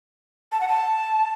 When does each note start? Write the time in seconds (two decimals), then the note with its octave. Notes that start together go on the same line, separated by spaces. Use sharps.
0.52 A5
0.61 F#5
0.68 A5